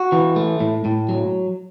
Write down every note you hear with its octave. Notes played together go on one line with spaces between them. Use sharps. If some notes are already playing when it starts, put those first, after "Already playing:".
Already playing: F#4
E3
A3
A2
A2
F#3